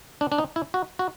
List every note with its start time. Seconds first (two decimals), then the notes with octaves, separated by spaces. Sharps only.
0.21 D4
0.32 D4
0.38 D#4
0.56 E4
0.74 F#4
0.99 F#4